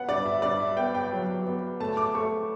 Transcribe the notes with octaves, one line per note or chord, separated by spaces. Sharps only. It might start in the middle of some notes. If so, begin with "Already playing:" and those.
Already playing: B3 F#5
G2 D5
E5
G2 D5
E5
B3 G5
G5
F#3
B3
A3 A5
D6
A3 C#6